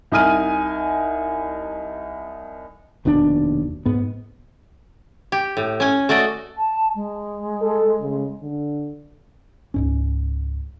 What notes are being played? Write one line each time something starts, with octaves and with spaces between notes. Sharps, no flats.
C2 D#4 D#5 G#5 F6 D#7
F1 D#2 B2 D4
G#2 B3
G4
A2
C#4 G#5
A3 F#4 D5 D#5
A5
G#3
A4
C#3
D3
C#2 G#2 C#4